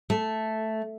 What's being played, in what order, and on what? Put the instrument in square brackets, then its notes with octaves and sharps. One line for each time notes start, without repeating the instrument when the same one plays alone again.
[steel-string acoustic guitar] A3